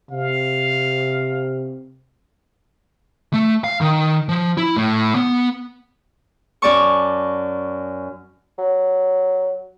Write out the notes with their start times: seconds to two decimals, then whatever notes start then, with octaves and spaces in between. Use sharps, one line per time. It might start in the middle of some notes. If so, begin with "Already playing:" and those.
0.11 C3 F5
3.33 A3
3.64 F5
3.81 D#3
4.29 F3
4.58 E4
4.77 A2
5.15 B3
6.62 F#2 D5 A5 C#6
8.58 F#3